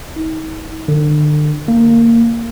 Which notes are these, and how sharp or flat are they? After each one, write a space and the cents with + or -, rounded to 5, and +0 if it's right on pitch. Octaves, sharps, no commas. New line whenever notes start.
D#4 +40
D3 +35
A#3 -15